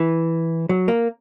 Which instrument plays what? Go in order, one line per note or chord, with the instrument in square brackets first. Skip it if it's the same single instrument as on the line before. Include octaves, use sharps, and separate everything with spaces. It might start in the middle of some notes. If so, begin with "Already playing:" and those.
Already playing: [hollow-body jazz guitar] E3
F#3
A#3